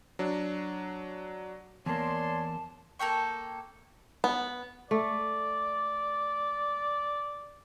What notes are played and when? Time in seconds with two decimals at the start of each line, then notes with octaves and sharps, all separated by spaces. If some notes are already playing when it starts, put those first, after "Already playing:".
0.19 F#3 D4
1.86 E2 A#3 C#5 D5 A5 C6
2.99 A#3 A4 G5 C#6
4.24 B3
4.91 A3 D5